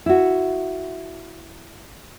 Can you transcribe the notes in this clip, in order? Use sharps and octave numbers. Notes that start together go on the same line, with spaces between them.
E4 F#4